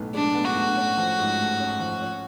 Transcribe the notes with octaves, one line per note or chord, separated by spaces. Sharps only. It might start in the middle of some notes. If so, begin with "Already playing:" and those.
Already playing: B1 A2 B3
G#3 D4
B3
F#4
A2
C#4
F3
G#2
A3
C#4
F3
C#4